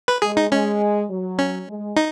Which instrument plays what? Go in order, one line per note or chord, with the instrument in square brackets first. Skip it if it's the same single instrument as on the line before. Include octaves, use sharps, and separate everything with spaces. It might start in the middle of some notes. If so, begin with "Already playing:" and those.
[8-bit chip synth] B4
[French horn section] G#3 [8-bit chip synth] G#4
[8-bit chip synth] D#4
[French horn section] G#3 [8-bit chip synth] C#4
[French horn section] F#3
[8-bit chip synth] C#4
[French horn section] G#3
[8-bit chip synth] D#4